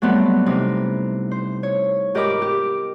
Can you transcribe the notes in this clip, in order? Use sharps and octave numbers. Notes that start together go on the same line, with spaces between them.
F#3 G3 A3 B3 C4
C3 E3 D#4
C5
C#5
G#2 G4 A#4 D#5 B5 D6
G4